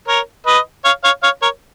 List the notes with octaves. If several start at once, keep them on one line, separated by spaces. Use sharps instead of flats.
A#4 C#5
B4 D#5
C#5 F5
C#5 F5
C#5 F5
A#4 C#5